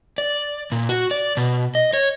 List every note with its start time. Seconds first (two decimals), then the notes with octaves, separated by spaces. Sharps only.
0.18 D5
0.72 A#2
0.89 F#4
1.11 D5
1.37 B2
1.75 D#5
1.93 C#5